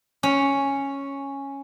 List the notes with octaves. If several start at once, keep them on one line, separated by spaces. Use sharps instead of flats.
C#4